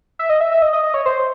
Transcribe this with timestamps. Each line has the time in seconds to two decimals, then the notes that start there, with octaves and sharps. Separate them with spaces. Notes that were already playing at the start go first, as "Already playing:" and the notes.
0.19 E5
0.29 D#5
0.40 E5
0.51 E5
0.62 D#5
0.73 D#5
0.83 D#5
0.94 C#5
1.06 C5